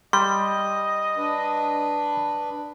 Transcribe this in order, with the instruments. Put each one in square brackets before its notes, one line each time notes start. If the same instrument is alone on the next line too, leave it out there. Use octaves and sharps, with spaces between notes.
[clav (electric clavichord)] G3 [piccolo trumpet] D#5 [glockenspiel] C6
[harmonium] D4 B4